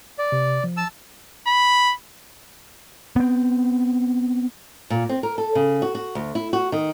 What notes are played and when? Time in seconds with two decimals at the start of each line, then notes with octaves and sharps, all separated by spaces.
0.19 D5
0.32 C3
0.64 F3
0.77 A5 E6
1.47 B5
3.16 B3 C4
4.90 A#2
5.09 C4
5.23 A#4
5.38 A4
5.55 C#3
5.82 F#4
5.95 F#4
6.15 D2
6.35 E4
6.53 F#4
6.72 D#3